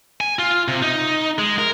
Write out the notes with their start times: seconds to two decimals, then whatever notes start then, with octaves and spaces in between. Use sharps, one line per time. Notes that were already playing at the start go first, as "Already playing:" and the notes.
0.21 G#5
0.39 F4
0.68 C3
0.82 D#4
1.38 G#3
1.58 A#4